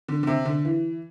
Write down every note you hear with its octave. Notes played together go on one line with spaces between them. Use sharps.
D3
D3
C3
D3
E3